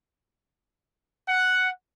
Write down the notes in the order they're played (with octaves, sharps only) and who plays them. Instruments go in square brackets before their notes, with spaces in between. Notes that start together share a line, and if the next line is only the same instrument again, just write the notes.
[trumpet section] F#5